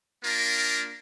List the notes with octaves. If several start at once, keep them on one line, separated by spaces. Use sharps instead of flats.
A#3 D4 F4 A#4